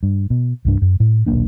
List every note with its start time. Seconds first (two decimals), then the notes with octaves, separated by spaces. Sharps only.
0.03 G2
0.30 B2
0.65 C2 G2 D4
0.82 F#2
1.00 A2
1.26 D#1 B1 A#3 D4